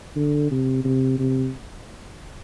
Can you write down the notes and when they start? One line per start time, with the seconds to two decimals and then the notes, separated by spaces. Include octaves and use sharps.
0.16 D3
0.51 C3
0.84 C3
1.19 C3